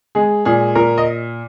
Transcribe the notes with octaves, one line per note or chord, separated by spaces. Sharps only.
G#3 G#4
A#2 G#4
A#2 A#4
D#5